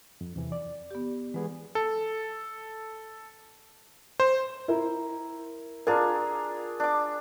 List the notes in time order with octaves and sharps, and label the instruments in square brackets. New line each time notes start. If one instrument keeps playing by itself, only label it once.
[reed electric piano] F2
E2 C3 E3
D5
[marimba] B3 G4
[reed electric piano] E3 B3 G#4 [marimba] G#3
[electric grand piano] A4
C5
[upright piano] E4 A#4
[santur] D4 F4 G#4 [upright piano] A#4
[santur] D4 D6